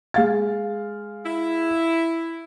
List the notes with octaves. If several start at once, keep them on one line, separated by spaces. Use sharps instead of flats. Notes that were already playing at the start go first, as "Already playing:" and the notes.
G#3 F5 A6
E4